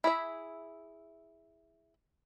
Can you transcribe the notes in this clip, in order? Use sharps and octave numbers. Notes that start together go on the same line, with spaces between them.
E4 G#4 E5